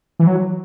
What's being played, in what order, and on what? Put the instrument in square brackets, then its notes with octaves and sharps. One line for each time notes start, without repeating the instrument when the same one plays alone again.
[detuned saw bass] E3
F#3